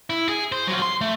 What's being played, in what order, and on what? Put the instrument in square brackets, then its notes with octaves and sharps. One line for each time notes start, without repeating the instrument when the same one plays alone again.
[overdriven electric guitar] E4
G#4
C5
F#3 F4
C6
A3